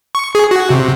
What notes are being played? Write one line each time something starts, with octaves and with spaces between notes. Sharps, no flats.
C#6
G#4
F#4
C3